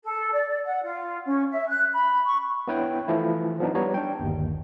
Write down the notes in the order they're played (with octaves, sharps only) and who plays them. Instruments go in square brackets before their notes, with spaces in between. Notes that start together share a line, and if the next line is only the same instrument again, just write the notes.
[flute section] A4
D5
D5
F#5
F4
C#4
E5
F#6
B5
C#6
[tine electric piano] B3 D4 E4 B4 C#5 G5
E3 F3 A3 E4
F3 F#3 B3 D4 D#4
G3 B3 C#5 A#5
D4 G5
G1 D#2